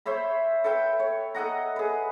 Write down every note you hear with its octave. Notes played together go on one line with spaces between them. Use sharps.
C5 C#5 E5 B5
A4 B4 E5 G5
C#5
A4 D#5 F#5 A#5
G#4 B4